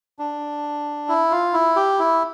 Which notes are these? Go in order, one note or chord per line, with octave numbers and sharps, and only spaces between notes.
D4
E4
F4
E4
G4
E4